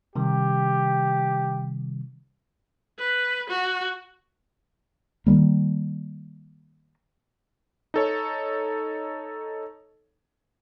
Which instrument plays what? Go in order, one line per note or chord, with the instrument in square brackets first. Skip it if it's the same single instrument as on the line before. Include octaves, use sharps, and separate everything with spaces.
[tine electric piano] C3 D#3 G3 [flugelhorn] G4
[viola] B4
F#4
[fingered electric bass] D#3 E3 G3 A#3
[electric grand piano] D#4 A4 C#5